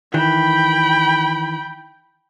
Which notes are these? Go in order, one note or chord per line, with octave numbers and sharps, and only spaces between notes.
D#3 E3 G5 B5